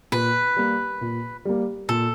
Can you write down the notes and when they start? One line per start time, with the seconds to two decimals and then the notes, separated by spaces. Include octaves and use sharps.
0.12 A#2 B4
0.56 G3 A#3
1.01 A#2
1.45 G3 A#3
1.89 A#2 A4